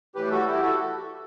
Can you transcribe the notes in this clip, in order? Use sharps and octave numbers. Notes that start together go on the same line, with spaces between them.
A2 E3 G3 G4 B4
F#4 A4
E4 G4
F#4 A4